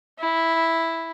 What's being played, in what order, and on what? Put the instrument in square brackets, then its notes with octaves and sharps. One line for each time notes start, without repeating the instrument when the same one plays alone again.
[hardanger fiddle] E4